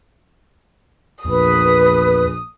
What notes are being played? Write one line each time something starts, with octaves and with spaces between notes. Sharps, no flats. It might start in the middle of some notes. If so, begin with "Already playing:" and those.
A#1 E2 B4 D#6